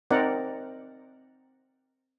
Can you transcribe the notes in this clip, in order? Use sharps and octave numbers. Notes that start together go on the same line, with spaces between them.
C4 D#4 A#4 D5 F#5